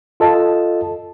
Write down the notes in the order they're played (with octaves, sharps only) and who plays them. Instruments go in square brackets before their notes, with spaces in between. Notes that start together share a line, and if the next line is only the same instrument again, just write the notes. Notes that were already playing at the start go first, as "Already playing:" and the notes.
[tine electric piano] F4 A4 D#5 A5